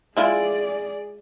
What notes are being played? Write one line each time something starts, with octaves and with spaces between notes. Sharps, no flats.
G#3 E4 F4 G#4 D5